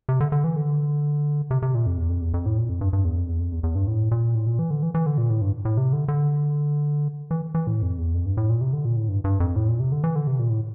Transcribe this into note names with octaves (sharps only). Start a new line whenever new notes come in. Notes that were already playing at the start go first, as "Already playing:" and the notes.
C3
D3
D3
E3
D3
C3
C3
A#2
F2
E2
F2
E2
F2
A2
A#2
F2
G2
G2
E2
F2
E2
F2
E2
E2
G2
A2
A#2
A2
A#2
E3
D3
E3
E3
D3
A#2
A2
G2
A2
C3
D3
D3
E3
E3
A2
F2
E2
F2
G2
A2
A#2
C3
D3
A#2
A2
G2
G2
F2
A2
A#2
C3
D3
E3
D3
C3
A#2
A2